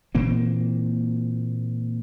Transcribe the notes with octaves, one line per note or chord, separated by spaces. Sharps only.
A#2 E3 A#3 C4